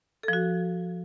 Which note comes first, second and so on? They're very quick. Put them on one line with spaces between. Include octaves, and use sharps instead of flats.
A4 F3 F#4